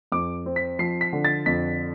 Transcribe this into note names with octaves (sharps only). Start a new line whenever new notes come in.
F2 D6
C4
B6
F3 C7
B6
D3
A6
F2 B6